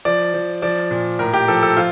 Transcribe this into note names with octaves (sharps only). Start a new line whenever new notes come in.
F3 D5
F3
F3 D5
A#2
A2 A#4
G4
F3 A4
A4
F3 F4